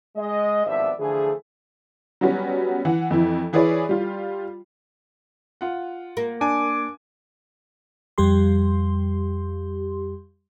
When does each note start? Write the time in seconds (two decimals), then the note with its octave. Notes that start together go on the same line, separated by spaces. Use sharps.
0.17 G#3 D#5
0.66 G#1 G2 F3 B3 D5 E5
0.99 D3 E3 F3 A3 G#4
2.21 F#3 G3 B3 C#4 F#4
2.85 E3 F#5
3.11 F2 E3 E4
3.53 E3 E4 G#4 B4 C#5 D5
3.89 G3 F4
5.61 F4 F#5
6.17 A#3
6.41 D4 G#5 D6
8.18 F2 G3 G4 C6